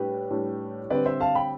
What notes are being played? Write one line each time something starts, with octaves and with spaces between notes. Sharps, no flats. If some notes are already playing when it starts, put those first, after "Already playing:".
Already playing: A2 G3 D4 G4 B4
A2 G3 D4
D3 G3 C4 G4 B4 D5
C5 E5
F5 A5
G5 B5